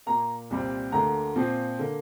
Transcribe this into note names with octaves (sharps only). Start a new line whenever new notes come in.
A#2 A#3 A#5
C2 A#2 G3 C4
D2 D3 A#3 A#5
A#2 F3 C4
D3 A#3